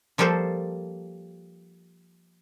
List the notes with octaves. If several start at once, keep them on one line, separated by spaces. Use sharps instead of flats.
F3 G3 A#3 A4 C5